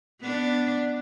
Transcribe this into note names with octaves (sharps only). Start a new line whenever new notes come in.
B3 D4